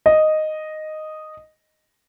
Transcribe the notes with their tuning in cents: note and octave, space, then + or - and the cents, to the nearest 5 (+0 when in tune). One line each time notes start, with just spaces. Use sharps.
D#5 -5